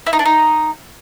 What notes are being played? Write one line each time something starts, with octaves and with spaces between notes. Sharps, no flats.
E4
D#4
D4
D#4